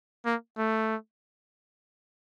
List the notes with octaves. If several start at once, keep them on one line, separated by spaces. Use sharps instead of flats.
A#3
A3